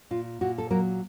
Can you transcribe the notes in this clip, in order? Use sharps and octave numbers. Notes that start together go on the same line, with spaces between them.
A#2 F4
A#2 F#4
A4
F#3 A#3 A#4